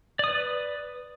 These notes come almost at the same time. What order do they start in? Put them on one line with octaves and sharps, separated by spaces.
D5 D#6 B4